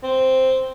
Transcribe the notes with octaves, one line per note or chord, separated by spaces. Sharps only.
C4